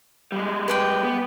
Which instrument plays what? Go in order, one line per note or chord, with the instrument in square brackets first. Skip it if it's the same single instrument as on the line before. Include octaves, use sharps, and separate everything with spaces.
[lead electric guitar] G3 G#3
[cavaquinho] B4 D5 G5
[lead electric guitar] B3